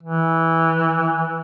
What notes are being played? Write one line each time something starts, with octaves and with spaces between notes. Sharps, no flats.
E3